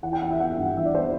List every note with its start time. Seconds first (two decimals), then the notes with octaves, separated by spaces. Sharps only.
0.03 E3 F#5
0.13 G5
0.22 E3 F#5
0.30 E5
0.40 B3 F#5
0.58 G2
0.76 E3 E5
0.85 D5
0.95 B3 C5